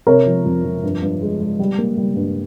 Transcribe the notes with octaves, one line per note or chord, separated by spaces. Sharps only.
C3 A#4 C#5
F3
F2
F3
G2
G2
G#3
G#3
G3
A#3
G3
G2